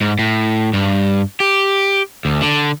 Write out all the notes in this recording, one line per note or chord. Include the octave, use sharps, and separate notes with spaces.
G#2
A2
G2
G4
D2
D3